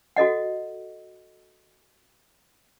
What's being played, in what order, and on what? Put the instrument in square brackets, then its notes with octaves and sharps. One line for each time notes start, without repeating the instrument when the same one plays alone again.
[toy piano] F#4 A4 D#5 F#5